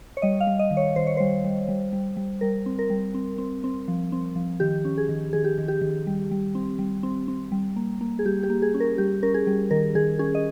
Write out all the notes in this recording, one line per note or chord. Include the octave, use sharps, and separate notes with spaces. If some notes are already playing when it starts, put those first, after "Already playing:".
C#5
G3 D#5
F5
G3
D#5
D#3
C#5
D#3 C5
C#5
G3 C5
G3
G3
G3
G3
G3 A#4
C4
A#4
G3
C4
C4
C4
F3
C4
F3
D#3 G4
C#4
G#4
D#3
D#3 G#4
G4
D#3
G4
D#3
G3
G3
C4
G3
C4
C4
G3
A#3
A#3
G#4
G3 G4
G4
A#3
G#4
C#4
A#4
G3 G4
C#4 A#4
G#4
G3
D#3 A#4
D#3 G#4
C#4 G#4
D#5